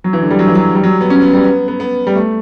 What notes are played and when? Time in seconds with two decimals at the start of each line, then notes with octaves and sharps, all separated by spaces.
0.04 F#3
0.13 E3
0.22 D3
0.31 G3
0.39 F#3
0.48 E3
0.56 F#3
0.75 G3
0.84 F#3
1.01 B3
1.10 C#4
1.22 B3
1.33 G3
1.45 B3
1.68 B3
1.80 B3
2.07 G3
2.15 A3